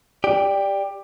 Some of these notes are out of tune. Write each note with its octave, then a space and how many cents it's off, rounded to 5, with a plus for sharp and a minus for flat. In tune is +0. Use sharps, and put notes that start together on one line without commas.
G4 +15 D5 +0